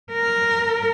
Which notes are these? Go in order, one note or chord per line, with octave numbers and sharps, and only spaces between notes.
A#4